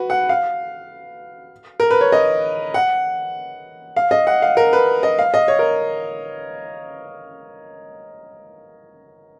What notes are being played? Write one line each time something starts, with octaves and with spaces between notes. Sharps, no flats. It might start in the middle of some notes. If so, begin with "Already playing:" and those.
Already playing: F#4 B4
F#5
F5
A#4
B4
C#5
D#5
F#5
F5
D#5
F#5
F5
A#4
B4
D#5
F5
D#5
C#5
A#4